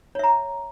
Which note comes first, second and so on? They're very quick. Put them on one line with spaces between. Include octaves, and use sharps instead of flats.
C#5 E5 A#5